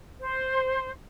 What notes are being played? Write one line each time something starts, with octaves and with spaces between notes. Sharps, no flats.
C5